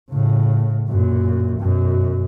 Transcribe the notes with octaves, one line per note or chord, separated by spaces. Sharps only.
A2 C#3
F#2 A#2
F#2 B2